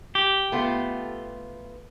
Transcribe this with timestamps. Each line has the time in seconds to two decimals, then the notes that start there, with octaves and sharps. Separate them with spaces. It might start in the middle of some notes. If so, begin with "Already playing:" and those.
0.15 G4
0.52 A3 B3 F4